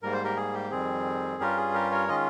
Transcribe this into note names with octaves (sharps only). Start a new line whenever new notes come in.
G#2 G3 A#3 A#4
C5
G4 A#4
G#4
G4
F2 D#3 G3 C4 G#4
G2 G3 C#4 F4 G4 A#4
G#4
G4 A#4
A#4 C#5
D#3 G#3 C#4 F4 D#5